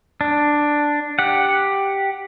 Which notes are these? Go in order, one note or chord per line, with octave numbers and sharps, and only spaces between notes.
D4
G4 F#5